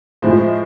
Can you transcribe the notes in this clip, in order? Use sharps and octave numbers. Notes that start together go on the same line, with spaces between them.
A2 F3 G#3 C5